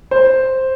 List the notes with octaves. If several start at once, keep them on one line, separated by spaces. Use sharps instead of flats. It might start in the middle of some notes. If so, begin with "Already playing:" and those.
C5